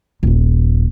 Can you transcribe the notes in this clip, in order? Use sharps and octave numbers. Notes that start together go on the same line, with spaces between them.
D#1 A#1